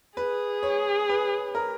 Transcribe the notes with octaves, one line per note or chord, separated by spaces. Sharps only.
G#4 B4
C#5
B4
A#4